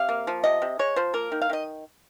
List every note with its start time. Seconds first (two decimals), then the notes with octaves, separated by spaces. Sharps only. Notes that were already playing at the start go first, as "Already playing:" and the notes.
Already playing: C3 F5
0.09 A#3
0.27 F3
0.44 C3 D#5
0.62 C3
0.79 G#3 C#5
0.96 F3 C5
1.14 A#3 A#4
1.32 D#3
1.42 F5
1.50 D#3 D#5